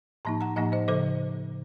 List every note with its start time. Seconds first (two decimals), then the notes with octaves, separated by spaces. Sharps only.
0.25 A2 F3 A#3 D#4 A5 C6
0.41 F#5 A#5
0.56 A2 F3 A#3 D#4 D#5 F#5
0.72 C5 D#5
0.88 C#3 F3 A4 C5